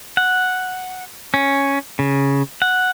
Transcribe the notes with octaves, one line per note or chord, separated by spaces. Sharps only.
F#5
C#4
C#3
F#5